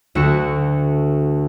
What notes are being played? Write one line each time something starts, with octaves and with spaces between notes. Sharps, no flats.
D2 A3 F#4 C#7 E7